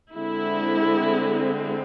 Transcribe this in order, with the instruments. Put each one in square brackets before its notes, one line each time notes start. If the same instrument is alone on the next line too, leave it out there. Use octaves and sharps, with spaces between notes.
[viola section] D3 G#3 C4 E4